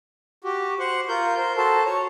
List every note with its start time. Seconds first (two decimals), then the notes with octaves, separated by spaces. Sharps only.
0.44 F#4 G4
0.80 C5 F#5 C#6
1.09 F4 A#4 G6
1.38 A#4 C5
1.57 F#4 A4 C5 A5
1.85 C#5